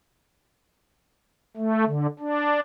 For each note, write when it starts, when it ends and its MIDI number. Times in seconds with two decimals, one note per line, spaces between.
1.57 1.85 57
1.86 2.07 50
2.20 2.60 62